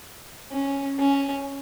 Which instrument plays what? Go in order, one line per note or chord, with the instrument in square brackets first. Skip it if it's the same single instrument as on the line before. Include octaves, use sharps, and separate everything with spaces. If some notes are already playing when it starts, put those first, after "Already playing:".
[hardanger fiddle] C#4
C#4